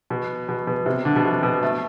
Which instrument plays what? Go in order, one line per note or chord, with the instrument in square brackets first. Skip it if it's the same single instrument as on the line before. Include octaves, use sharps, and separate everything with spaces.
[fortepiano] B2
B2
B2
C3
D3
B2
C3
B2
A3